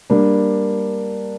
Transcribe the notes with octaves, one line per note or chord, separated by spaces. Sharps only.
G3 A#3 D4